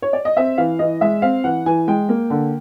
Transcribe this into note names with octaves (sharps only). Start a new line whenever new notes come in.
C#5
D5
D#5
C4 E5
E3 F5
E3 D#5
G#3 E5
C4 F5
E3 F#5
E3 G#5
G#3 G5
A#3
D3